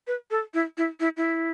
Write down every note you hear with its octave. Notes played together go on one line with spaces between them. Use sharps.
B4
A4
E4
E4
E4
E4